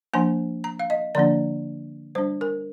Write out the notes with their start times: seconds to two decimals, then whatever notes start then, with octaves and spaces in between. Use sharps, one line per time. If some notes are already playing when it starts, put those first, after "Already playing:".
0.14 F3 A#3 D4 G#5
0.64 A#5
0.79 F5
0.90 D#5
1.15 D3 F3 A#3 D4 D5
2.15 G3 D4 C5
2.41 A#4